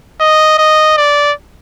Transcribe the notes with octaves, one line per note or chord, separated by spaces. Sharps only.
D#5
D#5
D5